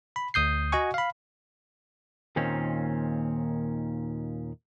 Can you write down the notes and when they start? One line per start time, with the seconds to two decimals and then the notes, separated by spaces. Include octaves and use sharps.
0.16 B5
0.34 D2 D#6 G6 C7
0.72 F#4 D#5 F#5 G#5 C#6
0.94 F5 B5
2.36 D#2 A#2 D#3 C4 C#4